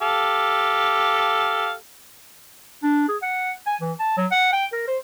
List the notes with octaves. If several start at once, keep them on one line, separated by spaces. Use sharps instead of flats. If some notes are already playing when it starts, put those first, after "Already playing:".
G4 A4 F5
D4
G#4
F#5
G#5
E3
A5
F#3
F#5
G5
A#4
C5